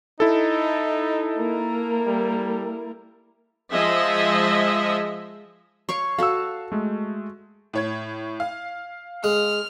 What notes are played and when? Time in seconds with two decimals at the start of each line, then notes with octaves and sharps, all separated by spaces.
0.20 D#4 E4 A4
1.37 A#3 A#4
2.06 G3
3.72 F3 G#3 D#5 E5
5.89 C#5 F5 C#6
6.18 F#4 A4 F5 E6
6.72 G#3 A3
7.73 A2 C#5 G#6
8.40 F5
9.24 G#3 F6